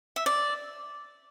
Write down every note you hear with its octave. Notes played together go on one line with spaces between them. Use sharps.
E5
D5